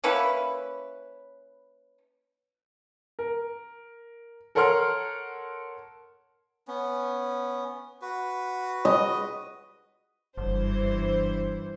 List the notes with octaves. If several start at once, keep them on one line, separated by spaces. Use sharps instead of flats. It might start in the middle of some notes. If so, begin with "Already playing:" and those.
A#3 C#4 E4 B4
A#4
A4 A#4 C#5 F#5 C6 F6
B3 C#4
F#4 B4
D#5
F#1 G2 E3 C5